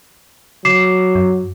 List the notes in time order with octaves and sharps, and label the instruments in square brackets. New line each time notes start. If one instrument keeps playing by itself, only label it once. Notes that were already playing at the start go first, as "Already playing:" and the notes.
[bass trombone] F#3 [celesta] D6 C7 E7
[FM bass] F#2